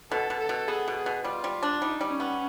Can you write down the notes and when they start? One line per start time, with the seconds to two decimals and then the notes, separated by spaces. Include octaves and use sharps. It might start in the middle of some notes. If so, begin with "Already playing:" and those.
0.11 B2 A4
0.30 B2
0.39 A4
0.49 B2
0.68 B3 G#4
0.88 B2
0.96 G#4
1.06 B2
1.24 G3 F4
1.44 G3
1.63 D4
1.82 G3 D#4
2.01 G3
2.11 C#4
2.20 B3